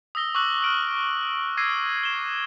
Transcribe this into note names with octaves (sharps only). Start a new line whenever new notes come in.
D#6 E6 A#6 G7
C#6 D6 E6 F#6 F#7
F6 D7 F#7
D6 E6 G#6 A#6 C7 D#7
E7 G7